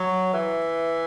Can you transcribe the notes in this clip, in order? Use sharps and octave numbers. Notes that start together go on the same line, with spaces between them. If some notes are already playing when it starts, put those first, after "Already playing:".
Already playing: F#3
E3